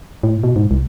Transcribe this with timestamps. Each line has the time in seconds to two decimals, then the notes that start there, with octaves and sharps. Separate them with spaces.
0.23 A2
0.44 B2
0.56 G#2
0.71 C2